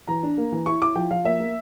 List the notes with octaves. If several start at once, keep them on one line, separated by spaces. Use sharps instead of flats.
E3 A#5
D4
A#3
E3
E4 C#6
E4 D6
F3 G5
F3 F5
A#3 E5
A#3